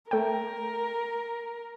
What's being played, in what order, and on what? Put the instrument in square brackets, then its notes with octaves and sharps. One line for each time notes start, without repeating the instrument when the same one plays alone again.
[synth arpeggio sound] A3 G5 [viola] A#4